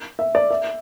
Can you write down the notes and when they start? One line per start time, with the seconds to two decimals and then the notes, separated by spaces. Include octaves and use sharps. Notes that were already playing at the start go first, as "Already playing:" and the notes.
0.19 E5
0.35 D5
0.51 E5